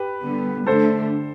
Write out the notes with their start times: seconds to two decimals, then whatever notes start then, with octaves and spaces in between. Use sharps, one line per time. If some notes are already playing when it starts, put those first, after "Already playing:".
Already playing: G4 B4
0.21 D3 G3 B3
0.67 D3 A3 D4 A4 C5